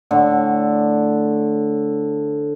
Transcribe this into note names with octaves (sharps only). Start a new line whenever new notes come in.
A2 D3